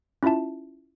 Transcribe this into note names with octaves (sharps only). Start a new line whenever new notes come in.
C#4 E4 F4 E5 A5